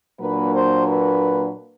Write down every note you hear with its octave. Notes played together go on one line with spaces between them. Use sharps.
A#2 F#3 A#3 D4 B4
C5
B4